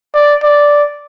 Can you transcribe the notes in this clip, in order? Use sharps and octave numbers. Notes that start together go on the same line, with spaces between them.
D5
D5